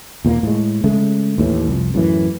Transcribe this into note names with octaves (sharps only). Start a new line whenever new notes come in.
D#2 A#2 A3 A#3
A2 G#3
C#3 G#3 A3
D#2 A2 E3
C2 F2
F#2 A2 E3